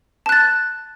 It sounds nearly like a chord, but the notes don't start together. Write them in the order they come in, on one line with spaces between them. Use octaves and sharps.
A5 F#6 A6